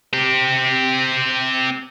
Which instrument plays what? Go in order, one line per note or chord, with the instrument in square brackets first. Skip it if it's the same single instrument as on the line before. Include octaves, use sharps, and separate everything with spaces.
[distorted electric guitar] C4 G4